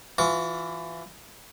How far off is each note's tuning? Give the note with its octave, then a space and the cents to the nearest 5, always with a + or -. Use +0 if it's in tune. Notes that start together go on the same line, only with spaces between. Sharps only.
E3 +25 F4 +35 C#6 +45